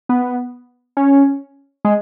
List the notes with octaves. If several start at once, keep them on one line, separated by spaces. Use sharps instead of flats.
B3
C#4
G#3